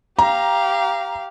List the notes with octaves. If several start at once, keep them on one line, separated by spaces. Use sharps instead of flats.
G4 F5 A#5